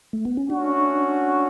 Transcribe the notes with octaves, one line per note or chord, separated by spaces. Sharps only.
A3
B3
C#4
A3 C#4 D4 F#4